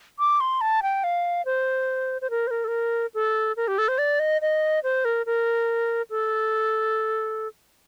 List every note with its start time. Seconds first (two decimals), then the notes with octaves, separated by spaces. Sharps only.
0.19 D6
0.40 C6
0.61 A5
0.83 G5
1.04 F5
1.46 C5
2.22 C5
2.30 A#4
2.47 C5
2.51 A#4
2.64 A4
2.68 A#4
3.15 A4
3.57 A#4
3.68 G4
3.78 A4
3.88 C5
3.98 D5
4.19 D#5
4.42 D#5
4.84 C5
5.05 A#4
5.26 A#4
6.10 A4